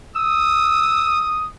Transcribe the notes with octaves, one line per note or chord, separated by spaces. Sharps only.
D#6 E6